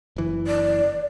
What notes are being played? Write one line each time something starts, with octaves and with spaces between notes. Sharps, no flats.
F#1 E3
D5